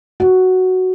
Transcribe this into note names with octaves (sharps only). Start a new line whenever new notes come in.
F#4